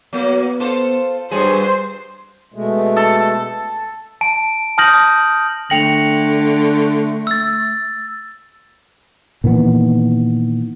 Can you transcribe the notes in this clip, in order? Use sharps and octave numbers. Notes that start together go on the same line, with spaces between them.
F#3 A#3 B3
F4 A4 C5
G2 F#3 G3 G#4 C5
B2 G#3 A3
A4
A5 D7
A5 D#6 F6 G6 A#6 F#7
D3 A3 G5 A#6 C#7 F7 F#7
E6 A6
A#2 D#3 E3 B3